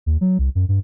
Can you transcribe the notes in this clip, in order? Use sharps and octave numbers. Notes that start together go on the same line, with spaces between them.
D#2
F#3
C2
F#2
G2